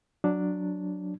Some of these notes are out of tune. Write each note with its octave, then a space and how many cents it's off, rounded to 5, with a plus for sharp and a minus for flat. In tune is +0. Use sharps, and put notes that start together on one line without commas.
F#3 -5 D4 +0